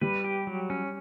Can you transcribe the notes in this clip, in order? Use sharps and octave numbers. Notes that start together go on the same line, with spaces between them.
G3 B4
G4
F#3
C#4